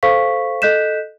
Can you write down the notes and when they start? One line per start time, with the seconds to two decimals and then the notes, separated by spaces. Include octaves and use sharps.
0.03 A4 C5 F5 C#6 B6
0.62 A4 D#5 F#6 G6 B6 E7